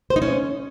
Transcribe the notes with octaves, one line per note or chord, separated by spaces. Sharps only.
C5
D#4
C#4